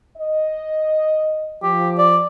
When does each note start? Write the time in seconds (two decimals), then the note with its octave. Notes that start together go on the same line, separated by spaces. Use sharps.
0.17 D#5
1.63 F3 G4
1.98 D5